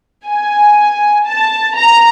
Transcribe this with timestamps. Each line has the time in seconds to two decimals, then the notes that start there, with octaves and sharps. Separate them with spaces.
0.27 G#5
1.26 A5
1.77 A#5